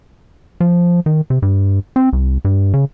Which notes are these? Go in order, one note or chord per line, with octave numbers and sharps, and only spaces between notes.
F3
D#3
C3
G2
C4
C2
G2
C#3